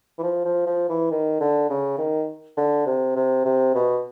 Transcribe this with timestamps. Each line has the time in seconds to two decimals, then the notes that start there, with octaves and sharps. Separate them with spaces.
0.18 E3
0.23 F3
0.45 F3
0.67 F3
0.89 E3
1.11 D#3
1.40 D3
1.70 C#3
1.98 D#3
2.57 D3
2.87 C3
3.16 C3
3.45 C3
3.75 B2